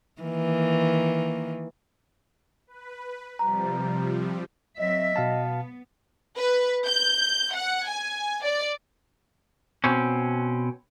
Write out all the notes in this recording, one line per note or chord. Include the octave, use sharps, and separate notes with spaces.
D#3 E3 A#3
B4
C3 F3 G3 A#5
F#3 C4 D#5 E5
B2 B3 F5 A5
B4
G6
F#5
G#5
D5
B2 C4 C#4